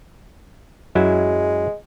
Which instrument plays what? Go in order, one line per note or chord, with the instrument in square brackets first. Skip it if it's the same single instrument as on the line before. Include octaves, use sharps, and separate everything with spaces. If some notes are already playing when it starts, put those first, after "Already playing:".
[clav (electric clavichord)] F#2 F#3 E4 [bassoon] G#3